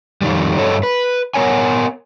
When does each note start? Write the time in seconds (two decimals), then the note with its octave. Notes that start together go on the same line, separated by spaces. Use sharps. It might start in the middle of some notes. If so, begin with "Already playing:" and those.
0.21 F2 D#3 G3
0.58 G2 A4 C#5 D#5
0.83 B4
1.34 B3 A#4 C#5 G#5